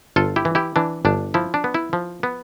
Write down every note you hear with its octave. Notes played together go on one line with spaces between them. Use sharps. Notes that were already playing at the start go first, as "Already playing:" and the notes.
G1 F4 A4
E4 G4
E3
E4 G4
E3 D4
G1 D4
F3 E4
D4
B3
E4
F3
B3